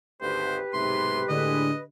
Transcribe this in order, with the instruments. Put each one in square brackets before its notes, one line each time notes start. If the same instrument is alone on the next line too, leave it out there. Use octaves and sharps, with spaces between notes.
[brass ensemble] G#1 D2 [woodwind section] G4 B4 [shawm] C5
[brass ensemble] B1 G#2 C3 [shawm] C6
[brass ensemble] A2 G#3 [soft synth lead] D3 [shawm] D#5